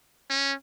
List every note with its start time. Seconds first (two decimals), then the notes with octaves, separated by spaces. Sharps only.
0.30 C#4